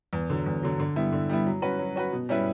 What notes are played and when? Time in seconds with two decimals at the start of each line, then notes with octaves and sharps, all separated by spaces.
0.13 E2
0.30 D3 F#3
0.46 E2
0.63 D3 F#3
0.80 D3
0.96 G3 B3 E4
1.12 D3
1.29 G3 B3 E4
1.46 F#3
1.62 C#4 F#4 B4
1.79 F#3
1.96 C#4 F#4 B4
2.13 B2
2.29 G3 C#4 E4 B4